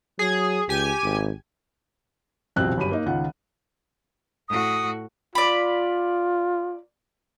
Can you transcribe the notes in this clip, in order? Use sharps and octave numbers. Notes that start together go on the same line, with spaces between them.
F#3 G#4
C#2 G4 G#5
G#1
D#1 C2 F2 B2 C4 F#6
G1 F#2 G4 B5 D#7
A#3 D#4
C#2 D#3 F4 F#5
A2 F#4 D#6
F4 D5 B5